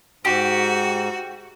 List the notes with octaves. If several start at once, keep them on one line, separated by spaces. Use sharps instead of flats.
G#2 F#4 G4